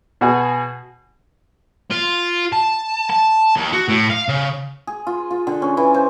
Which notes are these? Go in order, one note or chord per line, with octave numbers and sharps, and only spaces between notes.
B2 F#4 G#4
F4
A5
A5
D#2
F#4
A2
F5
C#3
G#4
F4
F4
D3
C#4
E3
C5